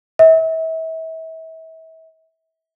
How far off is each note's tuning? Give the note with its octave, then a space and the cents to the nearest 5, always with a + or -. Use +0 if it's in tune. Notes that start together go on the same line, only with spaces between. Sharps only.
E5 -35